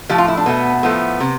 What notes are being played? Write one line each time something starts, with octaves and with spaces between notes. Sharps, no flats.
A2 F3 A3 G4
F4
E4
D4
B2 A3 B3
A2 F3 A3 B3
C3